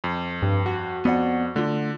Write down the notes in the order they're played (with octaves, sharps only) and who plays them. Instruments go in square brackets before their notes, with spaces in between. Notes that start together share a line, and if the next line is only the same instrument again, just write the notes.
[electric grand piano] F2
[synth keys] G2
F#4
[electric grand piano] F2 [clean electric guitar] B3 D5 F#5
[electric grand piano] D3 [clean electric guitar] A3 F4